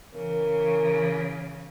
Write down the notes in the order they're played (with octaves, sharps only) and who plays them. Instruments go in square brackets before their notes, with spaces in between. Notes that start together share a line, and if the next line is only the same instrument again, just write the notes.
[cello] C#3 E3 [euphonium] A#4